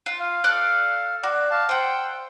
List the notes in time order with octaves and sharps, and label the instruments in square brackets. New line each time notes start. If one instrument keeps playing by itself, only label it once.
[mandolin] F4
[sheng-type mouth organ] F5
[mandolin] A4 D5 F#6
[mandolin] F#4 [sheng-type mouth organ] D5
[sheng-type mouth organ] F5 A5
[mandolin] C5 F#5 [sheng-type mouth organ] G5 E6